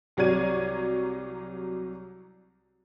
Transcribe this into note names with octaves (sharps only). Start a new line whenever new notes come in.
C2 F#3 C#5 D5 G#6 D#7